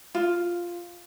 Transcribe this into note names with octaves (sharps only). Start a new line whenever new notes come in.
F4